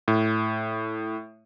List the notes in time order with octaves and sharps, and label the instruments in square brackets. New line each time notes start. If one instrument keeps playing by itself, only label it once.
[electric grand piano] A2